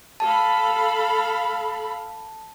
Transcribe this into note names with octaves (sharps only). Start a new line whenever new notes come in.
A4 F5 A5 B5